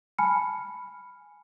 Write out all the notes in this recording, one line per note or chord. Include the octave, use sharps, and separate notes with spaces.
G#5 A5 B5 F6 C#7